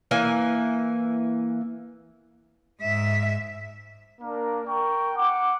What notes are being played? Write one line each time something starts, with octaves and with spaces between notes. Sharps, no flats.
E3 A#3 G#5
G#2 E5
A#3 D4 A#4
A#4 G5 C#6
F#5 D6